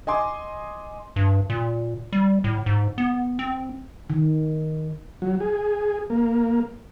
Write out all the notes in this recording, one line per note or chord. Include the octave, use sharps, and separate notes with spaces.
D#5 G#5 C6 D6
G2
A#2
G3
A2
G#2
B3
C4
D#3
F#3
G#4
A#3